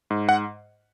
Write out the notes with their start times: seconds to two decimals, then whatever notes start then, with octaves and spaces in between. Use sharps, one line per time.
0.10 G#2
0.29 F#5